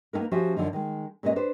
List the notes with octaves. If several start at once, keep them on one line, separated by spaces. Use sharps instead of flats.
A#3 B3 C#4 D#4 A#4
F3 C#4 F#4 G4 C5 E5
F#2 D3 F3 D#4
D#3 G#3
A#2 G#3 B3 C#4 D#5
D4 B4 C5